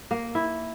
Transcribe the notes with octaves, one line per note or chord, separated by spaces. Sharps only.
A#3
E4